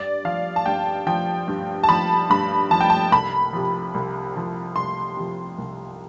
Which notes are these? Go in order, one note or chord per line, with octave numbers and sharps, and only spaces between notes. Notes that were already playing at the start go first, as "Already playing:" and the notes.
Already playing: G2 D5
F3 F5
A5
G2 G5
F3 G5
G2
A5
F3 B5
G2 B5
F3 A5
G5
A5
C2 B5
C3 F3
C2
C3 F3
C2 C6
C3 F3
C2